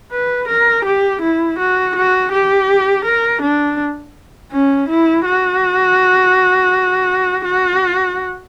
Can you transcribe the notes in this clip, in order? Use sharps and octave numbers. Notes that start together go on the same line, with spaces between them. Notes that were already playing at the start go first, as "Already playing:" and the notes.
B4
A#4
G4
E4
F#4
F#4
G4
A#4
D4
C#4
E4
F#4
F#4